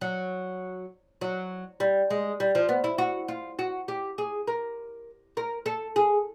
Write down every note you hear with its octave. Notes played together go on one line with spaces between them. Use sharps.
F#3
F#3
G3
G#3
G3
F3
B3
E4
F#4
F4
F#4
G4
G#4
A#4
A#4
A4
G#4